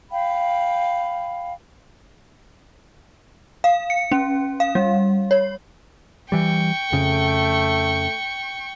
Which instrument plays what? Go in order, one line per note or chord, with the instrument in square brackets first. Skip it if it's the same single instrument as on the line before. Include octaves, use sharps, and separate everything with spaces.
[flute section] F5 G5 B5
[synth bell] F5
C#7
C#4
F5
G3
C#5
[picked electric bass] E3 G3 [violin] G5 C#6
[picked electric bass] F2 C#3 [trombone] A3